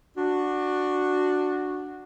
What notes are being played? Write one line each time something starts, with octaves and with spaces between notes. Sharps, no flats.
D4 F#4